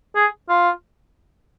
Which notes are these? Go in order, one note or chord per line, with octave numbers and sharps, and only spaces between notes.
G#4
F4